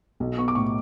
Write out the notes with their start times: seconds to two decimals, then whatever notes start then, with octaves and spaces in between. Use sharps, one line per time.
0.20 B1
0.38 B3 C#6
0.48 D6
0.55 A2 C#6